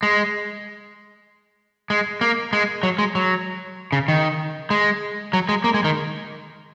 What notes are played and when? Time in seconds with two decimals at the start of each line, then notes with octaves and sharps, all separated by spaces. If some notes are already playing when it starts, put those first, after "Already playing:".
0.03 G#3
1.90 G#3
2.21 A#3
2.53 G#3
2.83 F#3
2.98 G#3
3.15 F#3
3.92 C#3
4.08 D#3
4.70 G#3
5.33 F#3
5.49 G#3
5.64 A#3
5.74 G#3
5.84 D#3